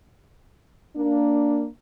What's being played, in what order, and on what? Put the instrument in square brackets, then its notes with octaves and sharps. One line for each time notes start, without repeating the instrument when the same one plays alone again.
[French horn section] A#3 D4